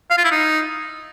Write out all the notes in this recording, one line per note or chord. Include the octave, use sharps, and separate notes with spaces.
F5
F4
E4
D#4